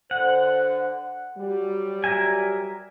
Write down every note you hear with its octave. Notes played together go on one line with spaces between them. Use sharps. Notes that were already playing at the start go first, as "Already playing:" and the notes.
D3 C5 F#5
F#3 G3
A#4 E5 G#5